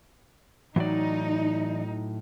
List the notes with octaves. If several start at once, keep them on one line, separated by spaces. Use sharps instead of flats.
A2 E3 F#3 D#4 D5